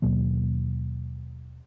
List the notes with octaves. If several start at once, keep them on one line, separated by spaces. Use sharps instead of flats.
D#2 B2 F#3 A#3